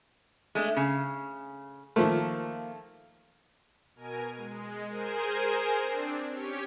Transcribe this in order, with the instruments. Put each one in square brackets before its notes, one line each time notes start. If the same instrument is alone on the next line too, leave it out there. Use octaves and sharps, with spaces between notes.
[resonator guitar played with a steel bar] G#3 A3 D4
C#3
[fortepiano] D#3 F3 A3 [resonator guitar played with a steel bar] A#3
[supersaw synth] B2 A#4 G#5
G#3
G#4 A#4 C5 G#5
C4 D4
C#4 G4 C#5